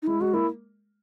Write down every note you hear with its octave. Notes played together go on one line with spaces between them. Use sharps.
D#4
G#3 E4
G#3 F#4
A#3 E4